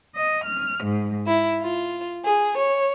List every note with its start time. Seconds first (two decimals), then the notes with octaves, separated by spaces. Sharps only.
0.16 D#5
0.45 F6
0.84 G#2
1.27 E4
1.60 F4
2.24 G#4
2.56 C#5